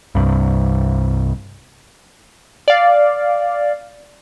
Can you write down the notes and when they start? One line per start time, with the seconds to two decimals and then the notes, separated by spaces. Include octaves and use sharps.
0.15 C2 G2
2.68 D5 F5